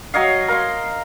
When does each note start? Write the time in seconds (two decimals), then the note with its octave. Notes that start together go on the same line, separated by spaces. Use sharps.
0.14 F#3 C#5 D#5 F5
0.48 A#4 F5 C6